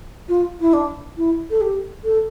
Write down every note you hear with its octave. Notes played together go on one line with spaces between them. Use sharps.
F4
E4
D4
E4
A4
G4
A4